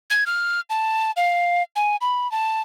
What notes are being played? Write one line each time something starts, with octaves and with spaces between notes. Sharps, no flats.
G#6
F6
A5
F5
G#5
B5
A5